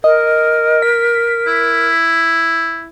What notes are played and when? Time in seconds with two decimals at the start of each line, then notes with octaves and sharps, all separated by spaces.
0.04 A#4 D#5
0.82 B6
1.47 E4